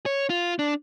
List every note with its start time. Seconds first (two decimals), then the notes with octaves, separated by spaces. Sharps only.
0.06 C#5
0.30 F4
0.59 D4